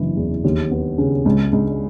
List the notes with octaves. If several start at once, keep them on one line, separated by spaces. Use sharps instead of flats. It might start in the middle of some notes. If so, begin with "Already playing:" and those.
Already playing: F#1 E3
E2
D#2
B3
C#3
C#2
C#2